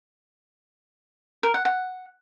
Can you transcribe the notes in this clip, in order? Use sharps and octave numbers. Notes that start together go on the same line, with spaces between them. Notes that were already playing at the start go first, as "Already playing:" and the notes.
A#4
F#5
F#5